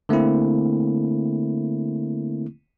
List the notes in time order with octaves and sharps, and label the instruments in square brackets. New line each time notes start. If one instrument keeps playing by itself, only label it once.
[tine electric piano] D3 A3 A#3 C4 E4